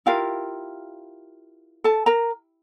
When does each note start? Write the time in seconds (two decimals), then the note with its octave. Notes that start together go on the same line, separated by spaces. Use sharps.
0.06 E4 F4 G4 A#4 F5
1.84 A4 A5
2.06 A#4 A#5